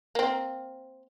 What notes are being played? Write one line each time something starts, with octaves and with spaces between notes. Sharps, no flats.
A#3 C4